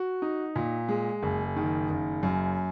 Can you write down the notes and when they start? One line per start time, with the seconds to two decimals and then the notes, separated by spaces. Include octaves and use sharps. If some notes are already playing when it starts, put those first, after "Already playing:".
Already playing: F#4
0.22 D#4
0.56 A#2
0.88 G#3
1.23 F#1
1.56 D#3
1.90 F#1
2.23 F#2